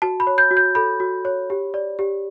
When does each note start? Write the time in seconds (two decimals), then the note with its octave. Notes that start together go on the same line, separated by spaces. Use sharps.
0.02 F#4 A5
0.20 B5
0.27 C#5
0.38 G6
0.51 F#4
0.57 G6
0.75 A4 B5
1.00 F#4
1.25 C#5
1.50 G4
1.74 D5
1.99 G4